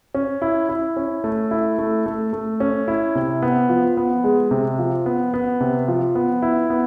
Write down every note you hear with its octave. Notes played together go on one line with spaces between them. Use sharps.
C#4
E4
E4
C#4
A3
E4
A3
A3
A3
C#4
E4
C3
B3
F3
B3
G#3
C3
F3
B3
B3
C3
F3
B3
E4
B3